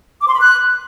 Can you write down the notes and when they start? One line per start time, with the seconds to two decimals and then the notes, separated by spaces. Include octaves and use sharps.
0.22 D6
0.28 C6
0.34 B5
0.40 F#6